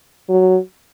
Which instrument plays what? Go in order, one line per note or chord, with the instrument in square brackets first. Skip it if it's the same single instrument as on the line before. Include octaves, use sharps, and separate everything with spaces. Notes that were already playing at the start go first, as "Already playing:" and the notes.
[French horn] F#3